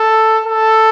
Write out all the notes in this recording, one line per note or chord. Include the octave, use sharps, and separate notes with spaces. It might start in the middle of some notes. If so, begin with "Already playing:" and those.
Already playing: A4
A4